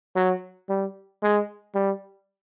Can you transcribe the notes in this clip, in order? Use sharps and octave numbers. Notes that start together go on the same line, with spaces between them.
F#3
G3
G#3
G3